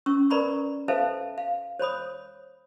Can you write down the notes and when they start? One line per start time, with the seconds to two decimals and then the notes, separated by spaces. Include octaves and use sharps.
0.06 C#4 C#6 E6
0.30 A#4 B4 D5 A#5 B5 C#6
0.88 A4 B4 C5 E5 F5 A5
1.38 F5
1.79 C5 C#5 B5 D#6